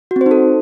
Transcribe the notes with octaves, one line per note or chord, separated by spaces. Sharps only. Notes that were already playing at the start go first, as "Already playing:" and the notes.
F#4
C4
C5
D#4
A4